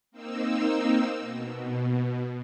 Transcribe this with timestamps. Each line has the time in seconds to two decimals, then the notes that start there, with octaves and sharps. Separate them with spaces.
0.11 A#3 C4 D#4 E6
1.19 B2